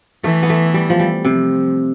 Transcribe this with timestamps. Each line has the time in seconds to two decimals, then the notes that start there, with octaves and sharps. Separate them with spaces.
0.24 E3 A3
0.43 B3
0.50 A3
0.74 G3
0.90 F3
0.99 G3
1.25 C3 F3